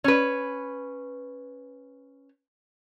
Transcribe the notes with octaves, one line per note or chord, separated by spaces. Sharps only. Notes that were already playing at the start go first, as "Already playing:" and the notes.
C#4 B4